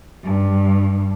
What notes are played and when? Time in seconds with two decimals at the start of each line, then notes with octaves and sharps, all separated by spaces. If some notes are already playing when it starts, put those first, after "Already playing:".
0.24 G2